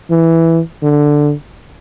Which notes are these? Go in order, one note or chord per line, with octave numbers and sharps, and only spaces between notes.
E3
D3